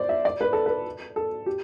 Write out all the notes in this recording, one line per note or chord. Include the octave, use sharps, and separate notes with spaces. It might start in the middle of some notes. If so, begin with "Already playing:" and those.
Already playing: C5 D5
E5
D5
B4
A4
B4
A4
G4